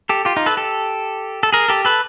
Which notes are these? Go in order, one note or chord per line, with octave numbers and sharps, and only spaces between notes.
G4 A4
F4 G4
D#4 F4
A4 B4
G4 A4
A4
G#4 A#4
G4 A4
A4 B4